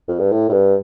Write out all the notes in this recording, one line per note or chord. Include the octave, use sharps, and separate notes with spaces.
F2
G2
A2
A2
G2